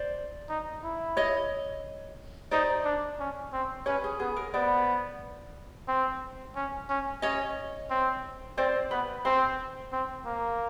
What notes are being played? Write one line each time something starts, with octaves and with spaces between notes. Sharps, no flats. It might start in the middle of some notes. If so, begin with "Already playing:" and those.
Already playing: C5 D5
D#4
E4
C#5 D#5
D#4 C5 D5
D4
C#4
C4
C#4 B4 C#5
G#4
B3 G#4
A#4
B3 C5 D5
C4
C#4
C#4
C#4 C#5 D#5
C4
C4 C5 D5
B3 B4
C4 C5
C4
A#3